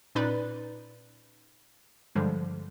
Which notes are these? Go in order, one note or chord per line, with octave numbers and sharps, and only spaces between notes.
A#2 C#4 D#4 B4 D5 B5
G2 D3 F3 G3 G#3